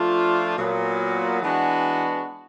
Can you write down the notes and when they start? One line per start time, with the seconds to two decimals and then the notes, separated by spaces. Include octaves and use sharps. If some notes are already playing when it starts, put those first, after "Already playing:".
Already playing: F3 A3 D4 F4
0.56 A#2 F#3 B3
1.41 E3 G#3 B3 D4 F#4